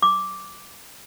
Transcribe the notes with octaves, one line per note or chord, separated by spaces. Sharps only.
D6